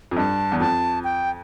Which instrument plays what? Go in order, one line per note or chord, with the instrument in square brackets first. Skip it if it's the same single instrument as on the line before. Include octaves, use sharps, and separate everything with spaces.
[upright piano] F2
[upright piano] G2 [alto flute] A5
[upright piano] E2
[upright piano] F2 [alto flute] A5
[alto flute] G5